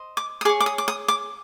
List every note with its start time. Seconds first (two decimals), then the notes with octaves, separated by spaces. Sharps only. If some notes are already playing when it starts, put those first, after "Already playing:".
Already playing: C5 D#5
0.17 D6
0.41 D#6
0.45 G#4 D6
0.49 C#5
0.61 D6
0.66 D#6
0.78 D6
0.88 D#6
1.08 D6